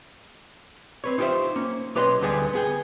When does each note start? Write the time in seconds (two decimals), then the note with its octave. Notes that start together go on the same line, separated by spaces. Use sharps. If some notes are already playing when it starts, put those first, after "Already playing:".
1.04 C4 B4 C#5
1.18 D#4 F4 G4 A4 C5 E5
1.56 A#3 C#4
1.95 B1 G4 B4 C#5 D#5 C6
2.21 D2 D3 G3 B3 G#4 B4
2.53 B3 G#4 G5